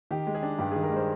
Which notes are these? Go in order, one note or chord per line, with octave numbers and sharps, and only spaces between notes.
D#3 G4
G#3
G#4
D4
G2 G4
D#3 G#4
A#4
G#3 C5